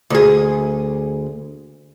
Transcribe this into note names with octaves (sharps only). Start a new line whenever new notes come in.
D2 G#4